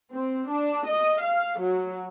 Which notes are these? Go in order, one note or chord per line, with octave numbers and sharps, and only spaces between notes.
C4
D4
D#5
F5
F#3